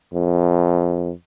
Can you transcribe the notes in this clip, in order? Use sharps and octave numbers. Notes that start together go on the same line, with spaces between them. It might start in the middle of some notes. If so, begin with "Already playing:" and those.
F2